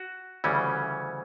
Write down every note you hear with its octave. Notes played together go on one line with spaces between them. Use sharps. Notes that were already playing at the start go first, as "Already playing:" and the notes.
Already playing: F#4
D2 C#3 E3 G3 C#4